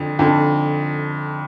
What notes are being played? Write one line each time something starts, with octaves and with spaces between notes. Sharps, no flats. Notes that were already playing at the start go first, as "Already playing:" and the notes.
Already playing: F2 D3
F2 D3